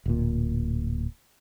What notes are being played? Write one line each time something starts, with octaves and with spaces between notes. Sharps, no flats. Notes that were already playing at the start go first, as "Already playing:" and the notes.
D1 A#2